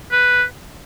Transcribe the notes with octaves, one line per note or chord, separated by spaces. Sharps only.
B4